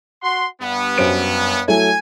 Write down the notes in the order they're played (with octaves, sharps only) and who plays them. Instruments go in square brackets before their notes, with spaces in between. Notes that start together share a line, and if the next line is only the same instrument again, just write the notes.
[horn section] F#4 F#5 C6
G2 B3
[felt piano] F#2 C5 D7
[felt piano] F#3 A3 E4 [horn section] G#5